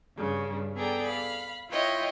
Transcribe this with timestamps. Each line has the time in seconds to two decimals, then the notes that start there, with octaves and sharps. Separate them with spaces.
0.18 G2 C#3
0.76 B3 G#4 A4 D5 G5 A#5
1.05 F5 B5
1.71 E4 F4 C#5 D#5 G5